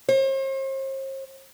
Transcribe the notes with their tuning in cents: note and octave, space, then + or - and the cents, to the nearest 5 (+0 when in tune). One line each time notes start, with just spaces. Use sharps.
C5 +45